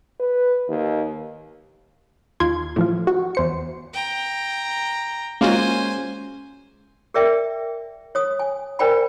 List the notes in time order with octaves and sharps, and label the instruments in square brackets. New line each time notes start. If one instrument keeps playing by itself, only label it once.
[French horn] B4
D#2
[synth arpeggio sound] D#2 F4 C6 G#6
A2 F3 F4
F#4
E2 C5 C#7
[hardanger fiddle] G5 A#5
[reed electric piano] G#3 [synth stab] A#3 F4 F#4 [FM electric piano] C#4 [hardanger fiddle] C5 G#5
[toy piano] G#4 A#4 D5 E5 G5
C#5 D#6
G#5
A#4 C5 D5 G5 G#5 B5